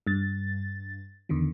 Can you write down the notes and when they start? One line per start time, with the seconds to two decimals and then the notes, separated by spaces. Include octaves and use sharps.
0.07 G2 A6
1.29 E2 D3 D#3